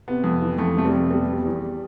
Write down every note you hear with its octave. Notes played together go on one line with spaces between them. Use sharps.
C3 B3
F2
E3
F2 A3
C3 A3
G3
F2
B2 G3
B2
E2